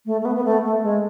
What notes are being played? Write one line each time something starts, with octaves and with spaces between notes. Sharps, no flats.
A3
A3
B3
B3
A3
A3
G#3